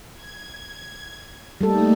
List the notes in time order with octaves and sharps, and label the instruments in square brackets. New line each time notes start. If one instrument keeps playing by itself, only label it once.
[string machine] G#6
[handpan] G3 A4 [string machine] A3 A#3 D#4